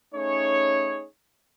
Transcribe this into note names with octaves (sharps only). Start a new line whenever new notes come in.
A3 C#4 D#4 G#4 C#5